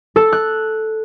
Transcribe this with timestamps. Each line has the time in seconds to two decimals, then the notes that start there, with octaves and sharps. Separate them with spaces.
0.16 A4
0.32 F#6